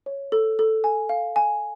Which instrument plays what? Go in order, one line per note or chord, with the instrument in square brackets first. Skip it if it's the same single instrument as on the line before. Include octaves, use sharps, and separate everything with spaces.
[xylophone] C#5
A4
A4
G#5
F5
G#5